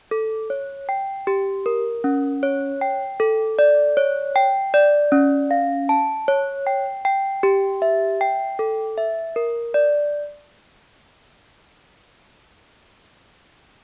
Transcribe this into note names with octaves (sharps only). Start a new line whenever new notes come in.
A4
C#5
G5
G4
A#4
C#4
C#5
G5
A4
D5
C#5
G5
D5
C#4
F5
A5
C#5
G5
G5
G4
E5
G5
A4
E5
A#4
D5